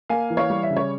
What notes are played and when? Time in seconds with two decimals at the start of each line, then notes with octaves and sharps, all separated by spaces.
0.09 A#3 F5 G#5
0.30 E3
0.37 C#5 F5
0.50 G3
0.63 E5
0.70 C#3
0.77 C#5